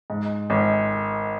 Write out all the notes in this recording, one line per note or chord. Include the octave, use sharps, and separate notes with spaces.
G#2
G#1